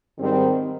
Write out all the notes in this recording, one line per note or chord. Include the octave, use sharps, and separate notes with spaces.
G#2 D#3 G3 C4